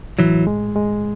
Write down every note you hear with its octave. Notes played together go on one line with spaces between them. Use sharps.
A2 E3 F#3
G#3
G#3